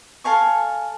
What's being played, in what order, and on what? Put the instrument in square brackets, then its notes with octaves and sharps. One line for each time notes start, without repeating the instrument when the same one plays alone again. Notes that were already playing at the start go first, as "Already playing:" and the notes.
[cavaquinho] A4 F5 G#5 C#6